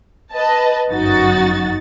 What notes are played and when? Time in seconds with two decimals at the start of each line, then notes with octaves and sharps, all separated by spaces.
0.32 B4 D#5 A5
0.89 G1 F#2 D#4 F#4 A6